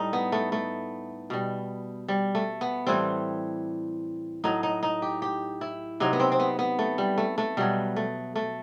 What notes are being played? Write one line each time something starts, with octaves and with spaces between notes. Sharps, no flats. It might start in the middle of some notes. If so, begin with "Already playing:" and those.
Already playing: A2 G3 D#4
B3
A3
A3
B2 G3
G3
A3
B3
A2 E3 G3 C4
A2 F#3 D#4
D#4
D#4
G4
G4
E4
C3 F#3 D#4
B3
C4
C4
B3
B3
A3
G3
A3
A3
B2 F#3 G3
A3
A3